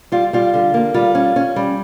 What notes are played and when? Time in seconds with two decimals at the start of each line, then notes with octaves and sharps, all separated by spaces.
0.12 G3 F4
0.33 G3 F4
0.54 D3
0.74 A#3
0.94 G3 F4
1.15 C#4
1.36 C#4
1.56 G3